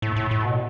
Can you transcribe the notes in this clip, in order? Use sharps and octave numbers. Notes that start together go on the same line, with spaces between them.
A2
A2
A2
B2